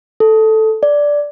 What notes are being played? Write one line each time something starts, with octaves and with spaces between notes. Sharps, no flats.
A4
D5